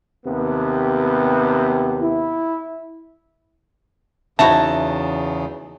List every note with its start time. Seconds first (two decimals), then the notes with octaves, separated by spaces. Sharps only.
0.25 D#2 C3 B3
2.02 E4
4.39 E2 C#3 D#4 E4 F#4 E5 A5